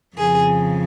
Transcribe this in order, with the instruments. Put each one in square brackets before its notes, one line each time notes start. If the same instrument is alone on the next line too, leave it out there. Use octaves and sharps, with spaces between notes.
[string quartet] F2 C#3 F3 G#4